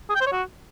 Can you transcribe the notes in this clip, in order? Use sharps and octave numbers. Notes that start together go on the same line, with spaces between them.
G#4
G5
C5
C#5
F#4